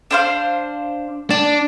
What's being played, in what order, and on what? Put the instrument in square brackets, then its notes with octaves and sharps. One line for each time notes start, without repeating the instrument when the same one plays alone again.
[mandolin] D4 C5 F5
[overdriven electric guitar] D4 [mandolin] A5